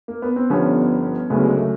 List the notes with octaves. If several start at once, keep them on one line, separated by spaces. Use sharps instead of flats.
A#3
B3
C4
G1 G2 D3 F3 B3 C#4
D2 C#3 F#3 A3 B3
G#3 A#3
A3